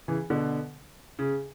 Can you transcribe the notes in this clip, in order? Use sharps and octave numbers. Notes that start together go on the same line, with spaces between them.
C#3 E3
B2 D3
C#3